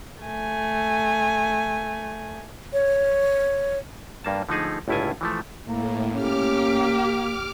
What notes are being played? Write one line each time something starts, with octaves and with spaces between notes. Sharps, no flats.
A3 G#5
C#5
G2 A#3 A5
D3 F3 A3 D#4 G#4
G1 C#2 A2 E4 F4 G#5
E3 F3 A3
A2 A#3
A#2 C#4 G4 D6 F6